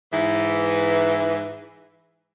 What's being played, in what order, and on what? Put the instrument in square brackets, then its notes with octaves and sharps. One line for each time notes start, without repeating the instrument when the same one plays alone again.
[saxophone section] G#2 E3